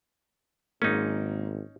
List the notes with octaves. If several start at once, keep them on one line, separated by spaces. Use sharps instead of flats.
G#1 G#2 G#3 A#3 C#4 D#4